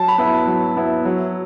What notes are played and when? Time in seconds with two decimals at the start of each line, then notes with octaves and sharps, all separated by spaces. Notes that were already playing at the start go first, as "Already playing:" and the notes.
Already playing: F#3 A5
0.08 B5
0.18 B3 E4
0.47 F#3
0.76 B3 E4
1.05 F#3